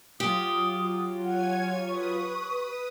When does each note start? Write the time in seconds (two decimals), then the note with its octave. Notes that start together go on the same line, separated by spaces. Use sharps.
0.20 F#3 F4 G4 D#6
1.24 C#5 F#5 G#5 G#6
1.89 B4 C#6 D#6